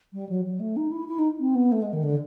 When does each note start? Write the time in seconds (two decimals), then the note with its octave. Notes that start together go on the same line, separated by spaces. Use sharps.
0.13 G3
0.29 F#3
0.45 F#3
0.59 A3
0.76 D#4
0.91 E4
1.08 E4
1.18 D#4
1.39 C4
1.55 B3
1.72 A3
1.82 G#3
1.93 D#3
2.03 D3